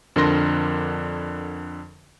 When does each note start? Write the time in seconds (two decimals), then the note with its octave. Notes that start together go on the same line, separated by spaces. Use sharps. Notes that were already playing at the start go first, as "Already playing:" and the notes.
0.16 F2 D3 D4 A#4 C6 A#6